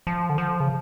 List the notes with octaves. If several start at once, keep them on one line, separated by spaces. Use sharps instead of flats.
F3
D3
F3
C#3